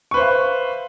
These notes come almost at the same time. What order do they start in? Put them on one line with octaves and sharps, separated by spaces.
C#6 B4 C5 E5 F5